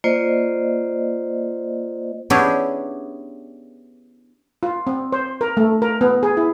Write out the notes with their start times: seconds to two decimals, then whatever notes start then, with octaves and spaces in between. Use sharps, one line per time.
0.04 A#3 F4 C5 D5 D#5
2.30 B3 C#4 D4 E4 G4 G#4
4.63 F4
4.87 C4
5.12 C5
5.41 A#4
5.57 A3
5.82 A#4
6.01 B3
6.23 G#4
6.37 E4